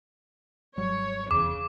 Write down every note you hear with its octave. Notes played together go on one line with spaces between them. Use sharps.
G#1 F#3 G3 C#5
F1 E2 C#3 E3 D6